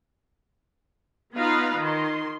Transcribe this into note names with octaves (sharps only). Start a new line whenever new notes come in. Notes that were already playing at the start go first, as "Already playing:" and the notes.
B3 D#4 F4 B4 F5
D#3 C6